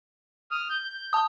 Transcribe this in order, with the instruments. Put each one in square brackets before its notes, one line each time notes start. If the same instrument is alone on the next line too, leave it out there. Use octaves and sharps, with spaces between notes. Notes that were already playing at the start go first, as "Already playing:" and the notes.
[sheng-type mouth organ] D#6 F6
G6
[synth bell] A5 D#6